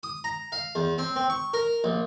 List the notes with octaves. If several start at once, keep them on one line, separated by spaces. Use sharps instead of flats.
D#6
A#5
F5
E2
C4
C4
C#6
A#4
A#1